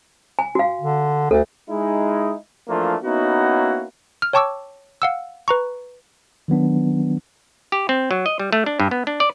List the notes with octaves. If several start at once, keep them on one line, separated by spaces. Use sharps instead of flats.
G#5
F#4 F5
D3
D2 A4
G#3 D#4 E4
E3 F3 A3 A#3 D4 F4
A#3 B3 C#4 D#4 E4 F#4
F6
C#5 G5 A5 C#6 D6 E6
F5 F#5 E6
B4 A#5 C#6
D#3 F#3 B3 D4
G4
C4
F#3
D#5
G3
A3
D4
G2
B3
D4
D5